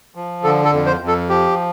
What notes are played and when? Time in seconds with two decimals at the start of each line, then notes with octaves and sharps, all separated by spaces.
0.15 F3
0.44 D3 A4
0.65 A4
0.72 F2
0.86 C5
1.00 F2
1.08 A4
1.29 F3 G4